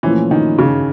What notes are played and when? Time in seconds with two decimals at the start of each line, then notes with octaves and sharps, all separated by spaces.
0.03 A#2 E3 F3 A3 C#4
0.31 D#3
0.58 C#3